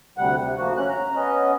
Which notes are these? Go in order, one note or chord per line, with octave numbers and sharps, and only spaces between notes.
D2 C3 G3 F#5
C3
D2 F3 A#3 F#4
C#4 F#6
A#5
B3 C#4 D#5